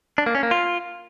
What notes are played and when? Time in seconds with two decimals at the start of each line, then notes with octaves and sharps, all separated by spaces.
0.18 D4
0.26 A#3
0.35 C#4
0.43 A#3
0.51 F4